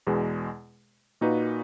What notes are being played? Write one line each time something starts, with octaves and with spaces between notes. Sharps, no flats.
E2 B2 G#3
A#2 A#3 D#4 F#4 B4